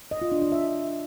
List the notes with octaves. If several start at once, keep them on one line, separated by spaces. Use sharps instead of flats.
D#5
F4
D4
D4
E5